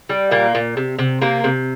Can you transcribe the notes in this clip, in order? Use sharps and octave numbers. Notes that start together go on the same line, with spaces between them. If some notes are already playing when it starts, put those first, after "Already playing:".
G3
A#2 A#3
A#2
C3
C3
C3 A#3
C3